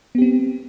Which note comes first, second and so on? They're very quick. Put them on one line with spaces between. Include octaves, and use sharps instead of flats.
B3 G4 C4